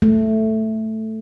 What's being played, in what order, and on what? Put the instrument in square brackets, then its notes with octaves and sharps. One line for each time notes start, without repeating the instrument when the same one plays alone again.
[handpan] A3